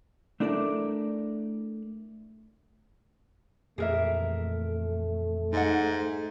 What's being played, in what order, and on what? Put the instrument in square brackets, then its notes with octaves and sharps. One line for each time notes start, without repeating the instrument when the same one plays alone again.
[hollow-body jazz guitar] A3 D4 E4 A#4 D5
[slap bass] F2 A#2 E3 [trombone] A3 [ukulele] G#4 A#4 E5
[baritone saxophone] G#2 [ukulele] D#4 F#5